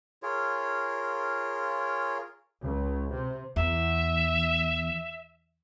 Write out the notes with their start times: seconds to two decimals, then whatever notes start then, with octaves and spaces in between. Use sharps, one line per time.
0.23 F4 G#4 A#4 C#5
2.62 C#2
3.12 C3
3.56 E2 E5